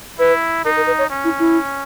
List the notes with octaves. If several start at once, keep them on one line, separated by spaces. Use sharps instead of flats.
E4 B4
D#4 A#4
A#4
B4
C#5
C#4
E4
E4